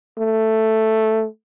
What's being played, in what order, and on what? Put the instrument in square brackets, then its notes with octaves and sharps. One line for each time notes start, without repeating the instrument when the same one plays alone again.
[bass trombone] A3